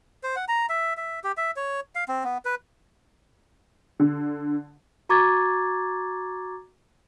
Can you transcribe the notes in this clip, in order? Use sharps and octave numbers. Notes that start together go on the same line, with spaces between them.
C5
F#5
A#5
E5
E5
G4
E5
C#5
F5
C4
B3
B4
D3
F#4 A#5 C#6 D6 G#6 A6